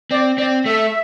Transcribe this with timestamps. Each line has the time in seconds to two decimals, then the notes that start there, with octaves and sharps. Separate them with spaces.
0.11 C4 D5
0.38 C4 D5
0.66 A3 E5